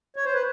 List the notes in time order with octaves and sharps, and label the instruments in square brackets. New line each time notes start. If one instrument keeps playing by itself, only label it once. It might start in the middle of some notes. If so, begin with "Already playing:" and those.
[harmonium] C#5
C5
B4